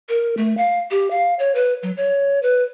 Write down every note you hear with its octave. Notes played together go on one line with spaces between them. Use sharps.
A#4
A3
F5
G4
F5
C#5
B4
F#3
C#5
B4